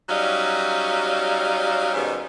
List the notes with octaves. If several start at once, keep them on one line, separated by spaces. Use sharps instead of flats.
F#3 G3 C#4 D#4 F5
G#2 B2 D#3 G3 C#4